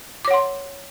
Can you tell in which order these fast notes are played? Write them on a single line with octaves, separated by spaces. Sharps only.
D6 C#5 F#5 C6